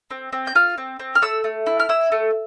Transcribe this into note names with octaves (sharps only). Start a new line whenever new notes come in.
C4
C4
G6
F4 F6
C4
C4
F6
A3 E6
A3
E4
F6
E4 E6
A3